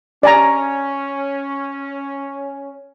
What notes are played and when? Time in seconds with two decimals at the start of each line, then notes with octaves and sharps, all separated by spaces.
0.23 C#4 D5 G#5 A#5